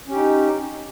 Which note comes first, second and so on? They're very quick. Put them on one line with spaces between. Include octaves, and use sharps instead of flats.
C#4 G4 D#4